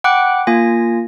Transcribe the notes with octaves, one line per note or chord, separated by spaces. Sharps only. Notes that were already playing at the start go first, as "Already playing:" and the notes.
F#5 G5 B5 D6 F#6
A#3 F4 G#5 A#6